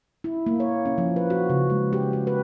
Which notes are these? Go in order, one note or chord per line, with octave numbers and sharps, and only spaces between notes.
E4
A#3
C#5
C#4
F3
B4
F#4
C#3
G#3
G4
F#4
B4